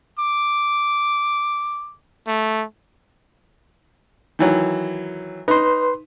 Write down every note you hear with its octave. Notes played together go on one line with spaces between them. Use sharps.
D6
A3
D#3 E3 F#3
D#4 B4 C6